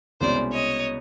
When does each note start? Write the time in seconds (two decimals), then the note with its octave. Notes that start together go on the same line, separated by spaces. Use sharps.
0.21 C2 B2 G#3 C#4 C5 D5
0.52 C#5 D#5